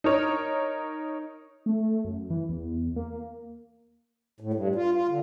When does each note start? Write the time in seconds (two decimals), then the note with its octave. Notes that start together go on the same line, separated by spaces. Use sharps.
0.04 D#4 A#4 C#5
1.66 A3
2.05 F#2
2.30 E3
2.49 E2
2.96 A#3
4.40 A2
4.54 G2
4.75 F4
4.94 F4
5.09 D3